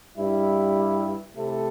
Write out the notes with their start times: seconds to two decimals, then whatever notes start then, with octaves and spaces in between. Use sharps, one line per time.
0.18 G2 G3 E4
1.36 C3 A3 E4 A4